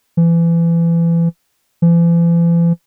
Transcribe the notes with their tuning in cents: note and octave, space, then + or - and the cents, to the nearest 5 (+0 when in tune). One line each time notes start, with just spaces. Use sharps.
E3 +30
E3 +45